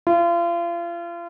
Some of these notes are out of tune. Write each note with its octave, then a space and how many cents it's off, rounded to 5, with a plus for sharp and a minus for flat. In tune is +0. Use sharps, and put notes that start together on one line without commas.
F4 -35